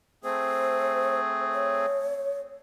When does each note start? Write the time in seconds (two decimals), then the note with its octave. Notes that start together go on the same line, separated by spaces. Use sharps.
0.24 A3 C4 G#4 C5
1.53 C#5